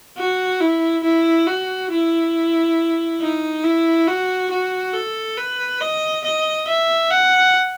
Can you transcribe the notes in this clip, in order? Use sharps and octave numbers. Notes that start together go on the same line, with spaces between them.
F#4
E4
E4
F#4
E4
D#4
E4
F#4
F#4
A4
B4
D#5
D#5
E5
F#5